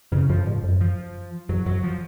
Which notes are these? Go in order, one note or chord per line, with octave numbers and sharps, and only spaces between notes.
F2 C#3
F#2 F3
G#2
F#2
F3
F2 F#3
F#2 F#3
F3